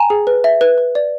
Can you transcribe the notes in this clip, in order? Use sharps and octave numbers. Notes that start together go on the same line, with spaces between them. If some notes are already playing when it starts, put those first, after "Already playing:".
Already playing: G5 G#5 A#5
G#4
B4
E5
B4
B4
D5